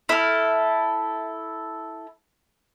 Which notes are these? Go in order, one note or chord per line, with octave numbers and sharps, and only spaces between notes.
E4 A4 F6